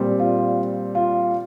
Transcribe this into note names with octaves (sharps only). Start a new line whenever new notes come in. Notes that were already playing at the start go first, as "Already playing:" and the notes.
Already playing: A#2 G3 C4
F4
F4